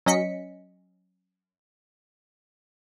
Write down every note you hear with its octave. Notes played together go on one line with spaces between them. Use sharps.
F#3 C#4 D#5 B6 C#7